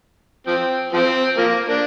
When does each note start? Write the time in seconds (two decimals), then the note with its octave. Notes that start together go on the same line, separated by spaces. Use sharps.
0.47 F3 C4
0.93 F3 C4
1.38 F3 A#3
1.69 A#3 D4